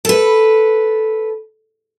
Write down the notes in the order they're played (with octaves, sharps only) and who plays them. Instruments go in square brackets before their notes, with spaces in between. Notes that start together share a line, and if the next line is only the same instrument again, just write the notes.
[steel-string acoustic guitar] A4 B4